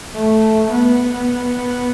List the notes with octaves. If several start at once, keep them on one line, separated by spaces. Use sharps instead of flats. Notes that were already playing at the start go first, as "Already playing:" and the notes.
A3
B3